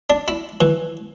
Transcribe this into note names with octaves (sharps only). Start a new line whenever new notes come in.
D4
E4
E3